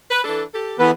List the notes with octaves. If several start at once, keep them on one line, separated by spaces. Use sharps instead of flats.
B4
E3 D4 A4
G4 A4
E2 E3 B3 E4 A4 B4